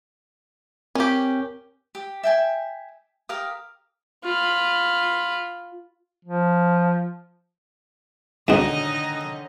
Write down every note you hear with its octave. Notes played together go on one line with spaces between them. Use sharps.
C4 C#4 G4 A#4
G4
E5 G5 G#5
G4 A#4 F5 D#6
F4 B5
F3
G#2 B2 D3 D#3 C#4 D#4 D#5